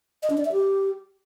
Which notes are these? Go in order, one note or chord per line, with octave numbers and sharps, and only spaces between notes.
D#5
D4
D5
E5
G4